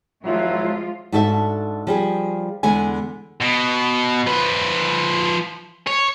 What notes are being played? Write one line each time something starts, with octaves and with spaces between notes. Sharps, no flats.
G#1 F3 F#3 G#3 E4 F4
G#2 D4 F#4 A4 A#4 E5
F3 G3 G#4
E2 D3 G#3 B3 G#5
B2
F3 B4
C#5